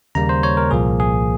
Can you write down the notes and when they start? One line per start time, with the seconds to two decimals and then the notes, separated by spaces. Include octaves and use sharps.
0.15 D#2 C#3 G3 A#3 A#5
0.29 C5
0.43 C#5
0.57 A#4
0.71 C2 A#2 F3 A#3 G#4
1.00 G#4